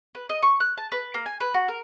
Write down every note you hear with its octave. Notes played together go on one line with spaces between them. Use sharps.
B4
D#5
C#6
F#6
A5
B4
A#3
G#5
B4
F#4
A#4